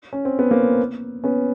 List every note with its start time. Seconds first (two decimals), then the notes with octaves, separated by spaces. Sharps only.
0.13 C#4
0.25 C4
0.39 B3
0.51 A#3 C4
1.24 B3 C#4